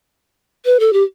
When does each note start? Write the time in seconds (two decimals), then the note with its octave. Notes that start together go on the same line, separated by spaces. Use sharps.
0.65 B4
0.80 A4
0.93 G4